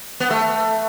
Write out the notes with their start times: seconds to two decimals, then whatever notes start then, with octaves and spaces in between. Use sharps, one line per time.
0.20 B3
0.30 A3